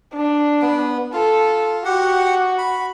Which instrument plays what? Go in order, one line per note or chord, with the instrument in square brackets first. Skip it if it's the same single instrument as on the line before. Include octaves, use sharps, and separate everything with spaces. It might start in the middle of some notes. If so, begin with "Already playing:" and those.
[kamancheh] D4
[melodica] B3
[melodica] F4 [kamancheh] A4
[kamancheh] F#4 [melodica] G4 F#5
[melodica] B5